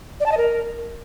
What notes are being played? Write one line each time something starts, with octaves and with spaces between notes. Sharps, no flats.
D5
A5
D#5
A#4